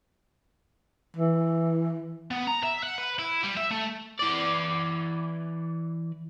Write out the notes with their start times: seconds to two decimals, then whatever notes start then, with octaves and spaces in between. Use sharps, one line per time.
1.16 E3
2.31 B3
2.47 A#5
2.63 E5
2.83 F#5
2.98 B4
3.19 E4
3.43 G3
3.57 E5
3.71 A3
4.19 E3 D5